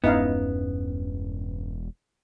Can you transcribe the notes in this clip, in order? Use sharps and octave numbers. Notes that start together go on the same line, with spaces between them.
E1 G2 B3 C#4 D#4 E4 F5